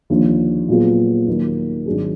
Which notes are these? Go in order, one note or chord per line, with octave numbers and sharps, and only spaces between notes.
D#2 D3 F3
A#2 F#3 B3 F4 G#4
D#2 D#3 F#3 A#3 D#4
G#1 G#2 F#3 D4 G#4